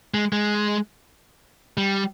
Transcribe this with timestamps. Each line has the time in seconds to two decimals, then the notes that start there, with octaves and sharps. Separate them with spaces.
0.14 G#3
0.33 G#3
1.77 G3